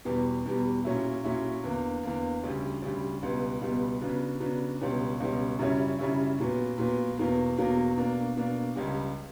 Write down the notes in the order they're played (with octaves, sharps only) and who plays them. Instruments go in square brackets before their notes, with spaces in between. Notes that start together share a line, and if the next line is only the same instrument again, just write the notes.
[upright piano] E2 B2 G3
E2 B2 G3
A#2 F#3 C#4 E4
A#2 F#3 C#4 E4
E2 D3 A#3
E2 D3 A#3
D2 C#3 G3
D2 C#3 G3
C#2 B2 G3 B3
C#2 B2 G3 B3
C#3 F#3 B3 D4
C#3 F#3 B3 D4
C#2 B2 G3 C#4
C#2 B2 G3 C#4
F#2 C#3 G3 C#4 E4
F#2 C#3 G3 C#4 E4
A#2 F#3 B3
A#2 F#3 B3
E2 B2 F#3 A#3
E2 B2 F#3 A#3
B2 A#3 D4
B2 A#3 D4
C#2 C#3 G3